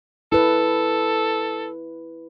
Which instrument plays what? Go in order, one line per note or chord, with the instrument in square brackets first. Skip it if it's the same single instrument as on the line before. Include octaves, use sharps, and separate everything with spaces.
[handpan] E4 B4 [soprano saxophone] A4